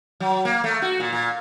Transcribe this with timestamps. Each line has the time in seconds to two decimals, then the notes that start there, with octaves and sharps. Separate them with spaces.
0.20 F#3
0.45 A#3
0.64 A3
0.82 F#4
1.00 A#2
1.13 A#2